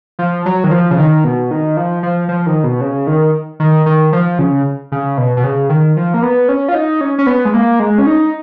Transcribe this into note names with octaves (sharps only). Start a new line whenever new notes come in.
F3
F#3
D#3
F3
C#3
D#3
B2
D#3
F3
F3
F3
D#3
B2
C#3
D#3
D#3
D#3
F3
C#3
C#3
B2
B2
C#3
D#3
F3
A#3
B3
C#4
F4
D#4
C#4
C#4
B3
G#3
A#3
G#3
C#4
D#4